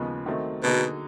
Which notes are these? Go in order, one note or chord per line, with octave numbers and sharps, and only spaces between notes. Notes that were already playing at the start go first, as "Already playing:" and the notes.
Already playing: D#2 C#3 F3 G#3 B3
D#3 F#3 A3 C4
B2 D3 F#3 A#3 D#4 G#4